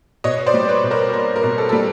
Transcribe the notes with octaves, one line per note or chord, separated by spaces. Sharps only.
B2 C#5 D#5
C5 D5
G3
B4 C#5
B2
A#4 C5
A#3 A#4
A#4
B2
A4
G3 A4